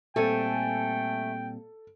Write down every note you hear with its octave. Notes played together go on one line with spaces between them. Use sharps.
A#2 G3 A3 C4 A4 G5 G#5